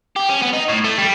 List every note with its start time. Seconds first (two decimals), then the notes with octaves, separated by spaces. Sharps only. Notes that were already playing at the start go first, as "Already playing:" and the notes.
0.16 G4
0.29 C#4
0.42 B3
0.53 D#4
0.68 A2
0.84 A3
0.98 G3